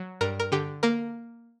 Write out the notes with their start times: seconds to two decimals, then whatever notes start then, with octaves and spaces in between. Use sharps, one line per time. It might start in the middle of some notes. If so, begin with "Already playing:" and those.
Already playing: F#3
0.21 G2 A#4
0.40 A#4
0.52 D3 G4
0.83 A#3 A#4